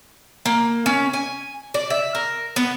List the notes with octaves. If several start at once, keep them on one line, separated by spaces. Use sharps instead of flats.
A#3
C#4
G#5
D5
E5
A#4
B3